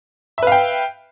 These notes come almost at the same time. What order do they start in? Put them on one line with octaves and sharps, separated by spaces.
E5 B4 F5 G5